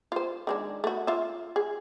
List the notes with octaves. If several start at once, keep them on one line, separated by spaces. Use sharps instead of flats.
F4 C5
D#3 G#3 D4
A3 F#4
F4 E5
G#4